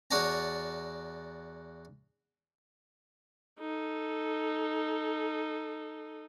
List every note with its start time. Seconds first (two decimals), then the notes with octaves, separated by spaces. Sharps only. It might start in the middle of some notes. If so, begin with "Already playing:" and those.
0.11 E2 F#4 C#5 D5 A5 A#5
3.60 D#4 A4